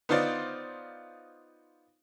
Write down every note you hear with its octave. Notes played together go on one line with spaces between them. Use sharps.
B3 D#4 F4 C5 D5